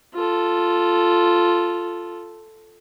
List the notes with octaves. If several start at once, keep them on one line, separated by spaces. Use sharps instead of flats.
F4 A4